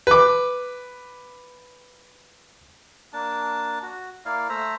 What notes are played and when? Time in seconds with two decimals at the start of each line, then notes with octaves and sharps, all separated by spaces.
0.07 B4 D6
3.13 A#3 D4 A5
3.83 F#4
4.25 A#3 E4 D5 F5
4.49 A3 C5 E5 A#5